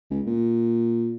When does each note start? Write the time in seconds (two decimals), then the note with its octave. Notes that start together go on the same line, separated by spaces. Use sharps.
0.11 C#2
0.27 A#2